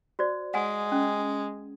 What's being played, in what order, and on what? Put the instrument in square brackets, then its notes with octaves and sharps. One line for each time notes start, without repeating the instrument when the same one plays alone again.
[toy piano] F#4 C5 D5
[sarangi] G#3 [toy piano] F#5 G#5
[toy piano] C#4